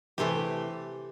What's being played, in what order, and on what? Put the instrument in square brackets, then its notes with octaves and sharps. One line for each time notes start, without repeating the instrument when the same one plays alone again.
[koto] C3 E3 A3 G4